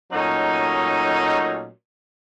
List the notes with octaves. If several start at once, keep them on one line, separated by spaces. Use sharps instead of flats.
A#2 F#3 A3 C#4 D#4